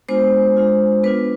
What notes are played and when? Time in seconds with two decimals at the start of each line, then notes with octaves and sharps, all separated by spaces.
0.09 G#3 B3 D4 F4 C5
0.57 G#3 D4 F4
1.03 B3 D4 F4 B4